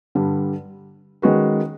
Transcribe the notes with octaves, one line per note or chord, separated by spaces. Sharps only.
G2 D3 G3
D#3 G#3 C#4 F#4 B4